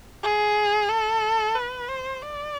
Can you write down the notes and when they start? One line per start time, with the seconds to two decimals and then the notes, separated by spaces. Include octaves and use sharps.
0.23 G#4
0.89 A4
1.56 B4
1.89 C5
2.22 D5